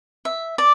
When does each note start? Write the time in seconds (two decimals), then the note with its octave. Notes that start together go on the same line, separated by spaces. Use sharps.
0.25 E5
0.58 D5